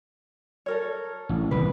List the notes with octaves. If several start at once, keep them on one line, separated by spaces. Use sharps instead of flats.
A4 A#4 C#5
A1
D#1 C2 B2 B4